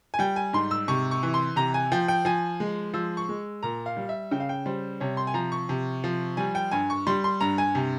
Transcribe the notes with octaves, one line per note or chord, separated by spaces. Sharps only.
G#5
G3 G5
G#5
G#2 C6
E6
C3 C#6
C#6
E3
C6
C3 A#5
G#5
F3 G5
G5
F3 G#5
G#3
F3 E6
C#6
G#3
A#2 A#5
F5
G3
E5
C#3 G5
F5
G5
G3 C5
C3 C#5
C6
G#5
F3 A#5
C#6
C3
F3
G3 G#5
G5
G2 G#5
C#6
G3 C6
C6
G2 A#5
G#5
C3